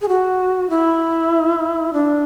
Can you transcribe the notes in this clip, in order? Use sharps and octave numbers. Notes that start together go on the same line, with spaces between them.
G#4
F#4
E4
D4